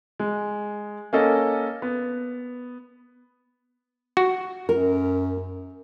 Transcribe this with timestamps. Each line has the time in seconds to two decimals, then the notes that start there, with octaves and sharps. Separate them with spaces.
0.19 G#3
1.13 A#3 C#4 A4 D#5
1.82 B3
4.17 F#4
4.69 F#2 A#4